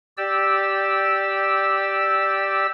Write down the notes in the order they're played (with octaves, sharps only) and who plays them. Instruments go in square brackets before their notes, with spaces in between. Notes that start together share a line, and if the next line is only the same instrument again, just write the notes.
[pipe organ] G4 D5 E6